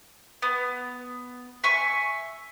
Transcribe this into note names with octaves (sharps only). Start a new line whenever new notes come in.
B3
E5 G#5 C#6